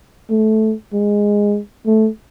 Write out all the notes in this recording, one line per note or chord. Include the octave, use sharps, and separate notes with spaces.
A3
G#3
A3